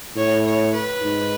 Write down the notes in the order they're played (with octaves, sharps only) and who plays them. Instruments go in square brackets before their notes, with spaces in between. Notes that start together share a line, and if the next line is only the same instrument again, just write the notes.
[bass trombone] A2 [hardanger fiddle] C#5
[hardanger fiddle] C#5
B4
[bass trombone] G#2